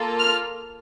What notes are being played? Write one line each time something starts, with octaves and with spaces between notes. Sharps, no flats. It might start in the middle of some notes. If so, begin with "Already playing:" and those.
Already playing: A#3 F4 A4
F6